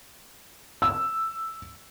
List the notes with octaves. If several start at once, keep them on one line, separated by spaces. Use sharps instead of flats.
E6